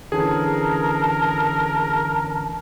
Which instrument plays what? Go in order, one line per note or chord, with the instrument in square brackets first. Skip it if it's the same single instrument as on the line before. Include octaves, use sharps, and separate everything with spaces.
[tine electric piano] D3 E3 C#4 [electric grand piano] G#4 [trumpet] A#4 [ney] A5